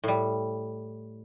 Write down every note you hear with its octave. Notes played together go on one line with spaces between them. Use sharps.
A2 G3